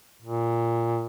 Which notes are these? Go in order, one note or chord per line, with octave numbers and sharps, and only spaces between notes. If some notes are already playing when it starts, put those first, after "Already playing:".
A#2